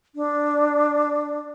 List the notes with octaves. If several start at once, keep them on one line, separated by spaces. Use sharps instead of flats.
D4